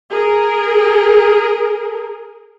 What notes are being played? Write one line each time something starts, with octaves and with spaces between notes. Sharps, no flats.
G#4 A#4